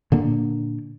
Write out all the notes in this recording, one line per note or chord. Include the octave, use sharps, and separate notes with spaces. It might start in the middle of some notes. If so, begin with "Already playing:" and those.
A#2 D3 A#3